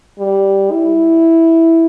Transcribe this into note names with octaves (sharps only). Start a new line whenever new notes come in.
G3
E4